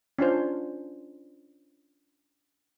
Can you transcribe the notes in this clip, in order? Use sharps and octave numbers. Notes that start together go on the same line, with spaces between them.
C#4 D4 F4 C5